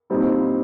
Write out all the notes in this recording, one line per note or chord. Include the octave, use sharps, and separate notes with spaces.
A#2 G3 C4 D#4